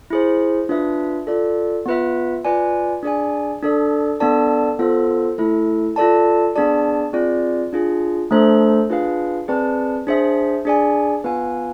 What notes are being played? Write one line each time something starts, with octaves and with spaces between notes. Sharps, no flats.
E4 G#4 C5
D4 F4 B4 E5
F4 A4 D5
B3 F4 B4 E5
F4 B4 D5 G#5
D4 G#4 D5 G#5
D4 A4 D5
B3 D4 A4 D5 A5
B3 F4 A4 C5
A3 E4 A4
F4 A4 D5 A5
B3 D4 G#4 D5 A5
C4 F4 G#4 D5
D4 F4 G#4
A3 D4 A4 C5
D4 F4 G#4 B4 F5
C4 G#4 B4 D5 A5
D4 G#4 C5 E5
D4 G#4 D5 G#5
B3 F4 B4 F5 G#5